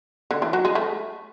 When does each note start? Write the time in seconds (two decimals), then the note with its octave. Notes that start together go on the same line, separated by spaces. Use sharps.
0.31 D3
0.42 E3
0.53 F#3
0.65 G#3
0.75 A3